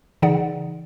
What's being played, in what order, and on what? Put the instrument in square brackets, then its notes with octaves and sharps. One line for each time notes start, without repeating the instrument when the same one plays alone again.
[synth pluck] C#3 E3 D#4 G#4 D5 F#5